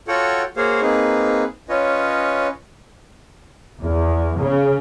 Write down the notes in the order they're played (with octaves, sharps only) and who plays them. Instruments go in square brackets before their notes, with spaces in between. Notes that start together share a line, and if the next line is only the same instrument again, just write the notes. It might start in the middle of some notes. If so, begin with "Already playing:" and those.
[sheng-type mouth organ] F4 F#4 A4 C#5 F#5 G5
A#3 F#4 G#4 C5 C#5 F5
A#3 C4 D#4 G#4 B4
C#4 F4 B4 C#5 D#5
[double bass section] E2
C#3